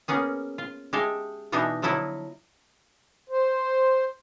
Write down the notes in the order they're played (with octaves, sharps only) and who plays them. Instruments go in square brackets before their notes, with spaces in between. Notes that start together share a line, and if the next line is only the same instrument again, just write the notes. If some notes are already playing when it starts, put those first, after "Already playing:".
[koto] A#3 B3 C#4 G#4
F4
G#3 G4 A4 E5 F5
B2 E3 B3 D4 D#4 E5
D3 F3 F#3 E4 A4 D#5
[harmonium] C5